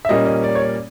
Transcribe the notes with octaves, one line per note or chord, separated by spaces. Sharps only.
E5
A#2 G3 A#3 C#4 D#5
D#5
D5
C#5
D5